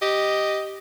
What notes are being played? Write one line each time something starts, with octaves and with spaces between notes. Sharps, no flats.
G4 D#5